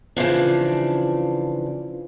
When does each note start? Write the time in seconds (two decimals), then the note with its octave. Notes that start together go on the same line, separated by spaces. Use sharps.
0.16 C#3 E3 F3 D4